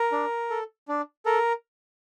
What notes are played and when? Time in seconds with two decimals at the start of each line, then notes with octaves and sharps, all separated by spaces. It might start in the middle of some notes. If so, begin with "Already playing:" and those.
Already playing: A#4
0.12 D4
0.50 A4
0.88 D4
1.26 A4 A#4